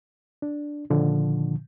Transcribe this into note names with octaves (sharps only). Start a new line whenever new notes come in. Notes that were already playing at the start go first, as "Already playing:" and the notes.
D4
A#2 D3 D#3 F3